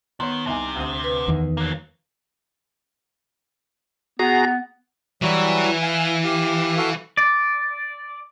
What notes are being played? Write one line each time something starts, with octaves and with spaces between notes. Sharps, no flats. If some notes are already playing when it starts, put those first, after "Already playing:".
D#3 B3 C#5 C6
C2 C3 D#4 G#5
D2 D#6
B4
E2 D#3
F#3 A#3
B3 F#4 G#4 A#5
E3 F#3 G3 F#4
F5 G#5
G4 F5
F#4 A4 F5
D5